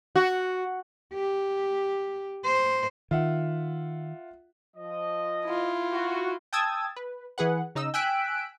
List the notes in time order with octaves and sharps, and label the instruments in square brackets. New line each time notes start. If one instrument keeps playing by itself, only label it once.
[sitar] F#4
[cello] G4
C5
[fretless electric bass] D#3 [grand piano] F4 E5 F#5
[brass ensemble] F3 D#5
[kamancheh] E4 F4
[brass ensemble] F#4
[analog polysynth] G5 A5 D#6 E6 G#6 A6
B4
E3 G#4 B4 F#5
C#3 D#4 D#5 E6
G5 G#5 E6 F#6 B6 D7